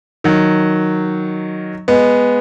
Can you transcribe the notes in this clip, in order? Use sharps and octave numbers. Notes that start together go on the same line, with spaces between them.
D#3 F#3
G#3 B3